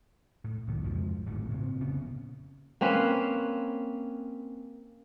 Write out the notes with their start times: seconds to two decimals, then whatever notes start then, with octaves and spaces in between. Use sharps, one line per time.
0.44 A2
0.67 C2 D#3 A#3
0.83 F2 G#2 C#3 F3
1.26 D1 G#1 G#2 A3
1.49 A#2 C#3 C4
1.80 F1 C#3 B3 C#4
2.81 A#3 C4 C#4 B4